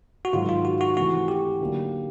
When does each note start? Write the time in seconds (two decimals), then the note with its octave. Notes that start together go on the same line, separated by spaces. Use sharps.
0.25 F#4
0.33 G#2 D#3 F#3 F4
0.49 F4
0.65 F#4
0.81 F#4
0.97 C3 E3 A3 F#4
1.28 G4
1.60 D3 F#3 A#3 D#4 F#4